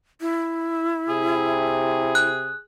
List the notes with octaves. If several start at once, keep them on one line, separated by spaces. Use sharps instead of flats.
E4
C3 G#4
F#6